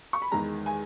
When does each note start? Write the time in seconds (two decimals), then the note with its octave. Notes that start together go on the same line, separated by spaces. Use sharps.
0.13 C#6
0.22 B5
0.32 E2 D#3 G#3 A#5
0.66 G#5